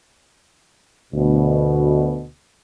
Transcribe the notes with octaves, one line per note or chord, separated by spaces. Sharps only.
D2 B2